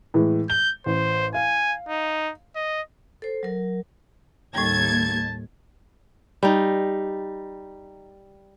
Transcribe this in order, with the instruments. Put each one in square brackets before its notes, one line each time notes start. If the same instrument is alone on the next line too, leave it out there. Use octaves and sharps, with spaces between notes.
[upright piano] A2 E3 G#3
[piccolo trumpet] G6 [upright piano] G7
[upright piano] A1 [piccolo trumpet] C5
[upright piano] F5 [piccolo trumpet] G#5
[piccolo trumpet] D#4
D#5
[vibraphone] A4 C5
F#3 A#4
[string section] D#2 G#6 [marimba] A2 G3 [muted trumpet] A5
[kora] G3 D#4